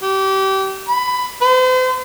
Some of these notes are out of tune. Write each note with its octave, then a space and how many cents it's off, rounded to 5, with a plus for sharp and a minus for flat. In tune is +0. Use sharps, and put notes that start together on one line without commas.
G4 -25
B5 +15
C5 -40